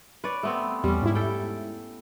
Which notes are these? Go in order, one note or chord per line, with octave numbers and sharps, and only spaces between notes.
B4 C#5 D5
A3 B3 C4
E2 G3 C#4
G#2 E4
A4 G5